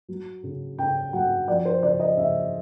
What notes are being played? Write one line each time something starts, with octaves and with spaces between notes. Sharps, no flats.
F#3
C#3
C#3 G5
F#3 F#5
F3 D5
C5
C#3 D5
D#5
C#3 E5